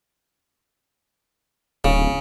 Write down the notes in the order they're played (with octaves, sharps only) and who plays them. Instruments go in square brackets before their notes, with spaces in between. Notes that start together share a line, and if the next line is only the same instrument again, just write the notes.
[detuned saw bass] D1 [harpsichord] C#3